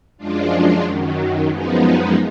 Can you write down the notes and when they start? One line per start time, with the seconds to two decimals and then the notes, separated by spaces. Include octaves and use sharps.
0.18 F#2 F3 G#3 D4 F4
0.83 F#2 D#3 F#3
1.48 F#2 F3 G#3 B3 D#4